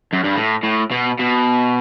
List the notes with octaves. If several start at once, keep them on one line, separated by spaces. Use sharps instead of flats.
F#2
G2
A2
A2
B2
B2